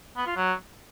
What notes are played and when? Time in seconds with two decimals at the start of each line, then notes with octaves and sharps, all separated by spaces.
0.17 B3
0.26 F4
0.36 F#3